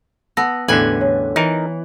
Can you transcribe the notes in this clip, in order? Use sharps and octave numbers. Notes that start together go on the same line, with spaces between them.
B3 A5 E6 A#6
A1 E2 D3 B4 G#5 F#7
C#5
E3 D#4 A#4